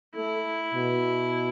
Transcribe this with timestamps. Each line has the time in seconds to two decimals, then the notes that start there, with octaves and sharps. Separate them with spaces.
0.14 A3 E4
0.73 B2